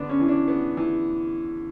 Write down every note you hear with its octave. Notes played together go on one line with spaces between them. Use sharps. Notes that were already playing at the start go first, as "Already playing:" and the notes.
Already playing: D3 B3 D4
C#4
E3
D4
B3
E3